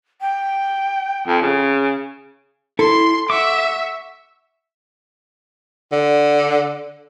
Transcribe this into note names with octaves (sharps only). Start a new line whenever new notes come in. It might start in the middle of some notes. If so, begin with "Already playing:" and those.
G5
F2
C#3
E4 A4 C6
E5 F#5 C#6 D6
D3